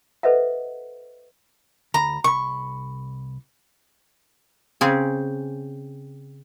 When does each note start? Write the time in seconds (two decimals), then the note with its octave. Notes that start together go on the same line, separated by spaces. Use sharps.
0.23 A4 B4 C5 D#5 E5 F#5
1.94 D2 A#5 B5
2.24 C2 B5 C#6
4.81 C#3 C4 G#4